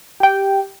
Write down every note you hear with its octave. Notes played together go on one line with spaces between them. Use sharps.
G4 G5